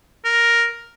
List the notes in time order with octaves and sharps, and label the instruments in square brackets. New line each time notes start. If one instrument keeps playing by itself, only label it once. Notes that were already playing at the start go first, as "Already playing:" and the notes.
[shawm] A#4